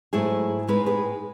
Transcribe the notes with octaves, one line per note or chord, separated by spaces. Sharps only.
G#2 F#3 A3 E4 G#4
A2 G#3 D#4 G#4 B4
G#4 B4